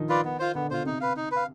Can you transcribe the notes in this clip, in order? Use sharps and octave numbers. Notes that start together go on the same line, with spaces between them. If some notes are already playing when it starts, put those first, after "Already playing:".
Already playing: D#3 F3 D#4
F4 B4 D5
B3
F4 C5
D3 B3
B2 F4 C5
C3 D#4
B4 F5
D#4
B4 F5